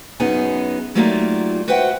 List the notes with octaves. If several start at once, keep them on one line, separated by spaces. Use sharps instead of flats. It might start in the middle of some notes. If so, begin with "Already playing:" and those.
F#2 B3 C#4 D#4 G#4 G#5
F#3 G3 A3 A#3 D#4 F4
F#4 B4 C5 E5 F#5 G5